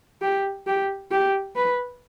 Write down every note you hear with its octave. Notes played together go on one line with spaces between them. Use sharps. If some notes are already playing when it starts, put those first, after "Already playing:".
G4
G4
G4
B4